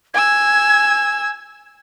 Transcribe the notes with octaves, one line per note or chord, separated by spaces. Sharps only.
G#5 E6 G#6